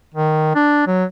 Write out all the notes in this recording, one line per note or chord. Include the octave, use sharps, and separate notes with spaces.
D#3
D4
F#3